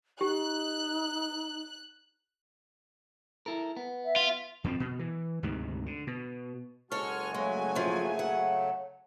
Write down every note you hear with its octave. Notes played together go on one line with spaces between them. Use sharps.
D#4 G4 F#6
E4 A4 A#4
B3
E5
F4
F2 F3 F#3 C4
B2
E3
D2 G#2 C3 D#3
D3
B2
F#1 G#3 F#4 A4 C#5 G#5 C#6 F6
C#3 F#3 G#3 A3
F#2 F3
F#5